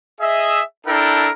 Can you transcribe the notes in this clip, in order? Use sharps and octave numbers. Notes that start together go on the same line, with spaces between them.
G#4 D#5 E5
D4 E4 A4 A#4 G5